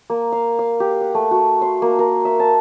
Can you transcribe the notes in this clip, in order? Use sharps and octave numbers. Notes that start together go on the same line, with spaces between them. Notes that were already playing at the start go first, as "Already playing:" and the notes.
A#3
F5
F5
G4
F#5
A3
F#4
C6
A#3
A#4
E5
A5